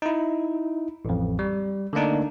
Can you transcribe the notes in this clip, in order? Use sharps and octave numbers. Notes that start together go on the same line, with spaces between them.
D#4 E4
A1 F2
G3
D3 A3 A#3 D4 D#4